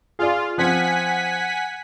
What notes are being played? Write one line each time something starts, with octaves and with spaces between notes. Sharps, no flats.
F4 G#4 D5
F3 C4 F#5 G#5 B6